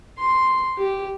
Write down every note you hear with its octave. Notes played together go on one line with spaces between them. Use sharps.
C6
G4